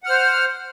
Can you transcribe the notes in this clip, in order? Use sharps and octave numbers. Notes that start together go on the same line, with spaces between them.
C5 F#5 F6